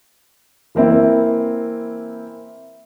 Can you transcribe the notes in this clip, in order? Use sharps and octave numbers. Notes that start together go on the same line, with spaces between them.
E3 A#3 C4 E4